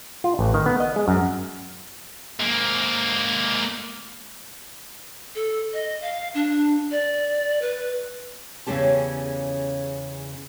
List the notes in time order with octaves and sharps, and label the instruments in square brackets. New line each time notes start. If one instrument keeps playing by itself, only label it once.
[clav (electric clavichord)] F4
A1
D#3
B3
D#5
G#3
F#2
[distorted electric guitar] G#2 A#3
[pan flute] A4
D#5
F5
D4
D5
B4
[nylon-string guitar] E2 C#3 E3 C#4 G4 A5